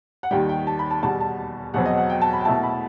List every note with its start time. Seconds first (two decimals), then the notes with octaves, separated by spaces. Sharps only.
0.23 F#5
0.31 D#2 D#3 G3 G5
0.49 G5
0.67 A5
0.79 B5
0.91 A5
1.03 E2 B2 G3 A5
1.21 A5
1.74 E2 B2 F#3 C4 F#5
1.86 D#5
1.97 F#5
2.10 G5
2.21 A5
2.33 B5
2.41 G5
2.45 B2 A3 E4 A5
2.63 B5